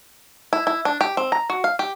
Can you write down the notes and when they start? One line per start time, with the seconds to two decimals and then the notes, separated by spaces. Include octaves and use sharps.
0.53 E4
0.67 E4
0.85 D4
1.01 G4
1.17 C4
1.32 A#5
1.50 F#4
1.64 F5
1.79 G4